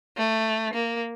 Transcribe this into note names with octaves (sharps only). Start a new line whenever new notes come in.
A3
A#3